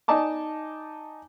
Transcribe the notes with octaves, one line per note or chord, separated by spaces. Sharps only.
D#4 D5 D#5 G#5 A5 D6